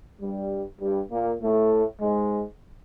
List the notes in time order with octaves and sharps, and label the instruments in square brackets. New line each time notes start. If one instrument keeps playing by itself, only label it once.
[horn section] G2 G3
G2 G3
A#2 A#3
A2 A3
G#2 G#3